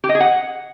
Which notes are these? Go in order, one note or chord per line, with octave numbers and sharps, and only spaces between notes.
G4
D#5
G#4
F#5